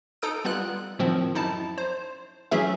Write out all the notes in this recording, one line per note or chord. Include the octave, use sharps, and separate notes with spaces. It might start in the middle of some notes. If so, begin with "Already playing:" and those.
D#4 A4 D#6 D7
G3 B3 F4 F#6
A2 D#3 F3 C4
F#2 D#4 E4 A5
C5
E3 F#3 A3 C#4 G#4 E5